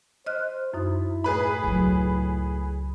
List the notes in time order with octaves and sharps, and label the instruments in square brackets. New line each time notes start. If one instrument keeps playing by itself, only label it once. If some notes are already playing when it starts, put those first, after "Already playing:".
[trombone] C5 [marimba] D#5 F6 F#6
[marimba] F#2 D#4 [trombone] E4
[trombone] A2 [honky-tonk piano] G#4 B4 B5
[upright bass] C#2 F#3